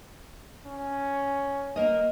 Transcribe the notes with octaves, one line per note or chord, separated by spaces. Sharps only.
C#4
A#3 A#4 D#5